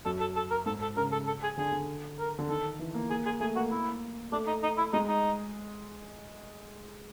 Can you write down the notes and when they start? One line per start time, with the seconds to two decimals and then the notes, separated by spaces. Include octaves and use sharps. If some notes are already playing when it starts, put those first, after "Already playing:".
0.05 F#2 A4
0.20 A4
0.36 A4
0.51 A#4
0.66 G#2 A4
0.82 A4
0.97 C#3 A#4
1.12 A4
1.27 A4
1.43 G#4
1.58 D3 G#4
1.72 D3
2.19 A#4
2.39 D3
2.49 D#3 A4
2.79 E3
2.94 A#3
3.10 A#3 G#4
3.26 G#4
3.40 A3 G#4
3.56 A#3 F#4
3.71 A#3 E4
4.32 A3 D4
4.47 D#4
4.63 D#4
4.78 E4
4.93 G#3 D#4
5.08 D#4